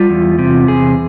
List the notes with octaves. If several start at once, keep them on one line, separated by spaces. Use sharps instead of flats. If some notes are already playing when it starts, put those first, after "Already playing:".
Already playing: G3 F4
E2
C3
E2 G#4